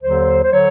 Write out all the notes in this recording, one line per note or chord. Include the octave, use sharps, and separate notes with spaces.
D#2 D3 F#3 C5
C5
D3 F#3 C#5